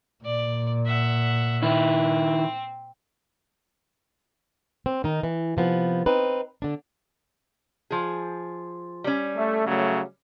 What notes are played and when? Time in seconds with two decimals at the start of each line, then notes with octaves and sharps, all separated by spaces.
0.25 A#2 D5
0.86 E5 F#5
1.63 D#3 C4 E4
4.86 C4
5.04 D#3 D#4
5.23 E3
5.57 C3 F3 B3
6.06 C4 D#4 B4
6.62 D3 D4
7.90 F3 G#4
9.04 G3 C#4
9.36 A3
9.66 C#3 F#3 A3